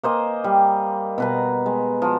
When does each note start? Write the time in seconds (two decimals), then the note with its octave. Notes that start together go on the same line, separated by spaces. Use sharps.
0.03 A#3 C5 D#5 G#5
0.44 G3
1.18 B2 B4 A#5
1.66 G#3
2.02 F3 F#4